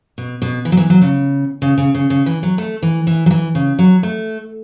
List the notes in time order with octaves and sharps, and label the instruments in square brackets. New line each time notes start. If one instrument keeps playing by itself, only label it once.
[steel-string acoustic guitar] B2
B2
E3
F#3
E3
F#3
C#3
C#3
C#3
C#3
C#3
E3
F#3
A3
E3
E3
F#3
E3
C#3
F#3
A3